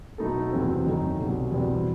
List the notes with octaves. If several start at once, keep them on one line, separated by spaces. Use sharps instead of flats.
B2 F#3 A3 D#4 A4
E2 C3 F#3 C4
F#2 D#3 A3 D#4
C2 B2 F#3
E2 B2 G3 C4